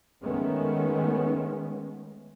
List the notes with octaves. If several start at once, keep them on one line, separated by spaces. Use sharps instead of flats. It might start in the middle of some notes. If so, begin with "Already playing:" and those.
D#3 G#3 A3 B3 C#4